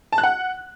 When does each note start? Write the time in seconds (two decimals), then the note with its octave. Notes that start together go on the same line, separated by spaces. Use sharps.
0.12 A5
0.18 F#6
0.23 F#5